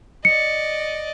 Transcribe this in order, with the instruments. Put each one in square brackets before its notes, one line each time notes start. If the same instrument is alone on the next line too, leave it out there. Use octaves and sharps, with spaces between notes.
[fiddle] D5 D#5 [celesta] C#7